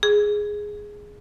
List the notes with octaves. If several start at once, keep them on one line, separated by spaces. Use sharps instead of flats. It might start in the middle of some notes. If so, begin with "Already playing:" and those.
G#4